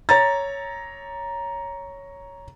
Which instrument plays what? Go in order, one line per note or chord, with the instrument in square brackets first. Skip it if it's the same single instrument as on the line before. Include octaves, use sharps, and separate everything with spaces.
[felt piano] C#5 A#5 A6